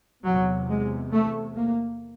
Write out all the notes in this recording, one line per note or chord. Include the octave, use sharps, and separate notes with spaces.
E2 C3 F#3
G#3
A3
A#3